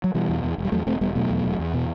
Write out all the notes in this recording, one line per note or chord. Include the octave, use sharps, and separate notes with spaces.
F#3
B2 E3 G3
E2
E2
E1
G3
E2 F#3 A3
E1 A3 C4
E1 G3 B3
B2 F#3 A3
E2
E1
E2
B2